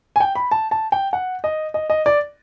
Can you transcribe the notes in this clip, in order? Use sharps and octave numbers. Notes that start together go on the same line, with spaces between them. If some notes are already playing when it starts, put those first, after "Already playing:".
G#5
G5
B5
A5
A5
G5
F#5
D#5
D#5
D#5
D5